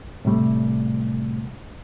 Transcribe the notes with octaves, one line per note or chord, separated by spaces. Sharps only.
A2 C3 G3 A3